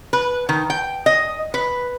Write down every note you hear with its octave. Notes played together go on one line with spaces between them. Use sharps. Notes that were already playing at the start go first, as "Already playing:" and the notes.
B4
D#3
G5
D#5
B4